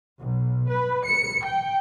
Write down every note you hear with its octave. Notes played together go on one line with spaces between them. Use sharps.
B1
B4
C#7
G5